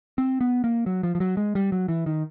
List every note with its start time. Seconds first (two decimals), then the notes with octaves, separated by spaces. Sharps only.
0.18 C4
0.41 B3
0.64 A#3
0.86 F#3
1.03 F3
1.15 F3
1.20 F#3
1.37 G#3
1.55 G3
1.72 F#3
1.88 E3
2.06 D#3